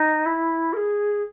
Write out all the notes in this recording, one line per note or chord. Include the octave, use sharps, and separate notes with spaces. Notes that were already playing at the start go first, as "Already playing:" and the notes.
Already playing: D#4
E4
A#4
G#4